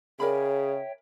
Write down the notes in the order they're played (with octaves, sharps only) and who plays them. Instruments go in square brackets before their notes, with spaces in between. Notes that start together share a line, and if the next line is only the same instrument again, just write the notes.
[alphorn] C#3 [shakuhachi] G#4 [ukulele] A#4 D5 B5 [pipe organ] C#5 E5 G5